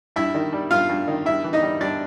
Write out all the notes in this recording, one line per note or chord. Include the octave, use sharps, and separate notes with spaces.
G2 E4 E5
D#3
G3
G2 F4 F5
G2
D#3
G2 E4 E5
E3
D#4 D#5
G3
G2 D4 D5